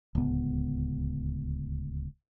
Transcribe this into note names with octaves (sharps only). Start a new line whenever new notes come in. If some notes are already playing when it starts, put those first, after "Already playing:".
D1 C#2 B3